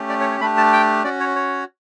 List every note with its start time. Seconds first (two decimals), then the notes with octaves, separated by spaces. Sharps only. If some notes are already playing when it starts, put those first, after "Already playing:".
Already playing: A3 C#4 G4
0.09 D5
0.21 C#5
0.31 C#5
0.41 A3 D4 G4 B5
0.57 A5
0.73 G5
1.04 C#4 F#4 D5
1.20 C#5
1.36 C#5